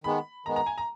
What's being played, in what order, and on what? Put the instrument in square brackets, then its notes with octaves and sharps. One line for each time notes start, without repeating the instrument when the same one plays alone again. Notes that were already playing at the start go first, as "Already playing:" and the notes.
[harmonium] D#3 G#3 B3 [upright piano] B5
[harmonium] D#3 G#3 B3 [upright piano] A#5
[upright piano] A#5
G#5
A#5